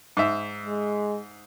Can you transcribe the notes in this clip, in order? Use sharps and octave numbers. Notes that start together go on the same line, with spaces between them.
G#2 E5
G#3